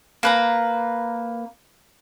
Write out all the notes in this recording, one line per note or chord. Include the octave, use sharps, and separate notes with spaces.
A#3 B4 A#5